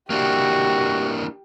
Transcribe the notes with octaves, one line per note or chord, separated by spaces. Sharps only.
A#3 D4 E4 F#4 G4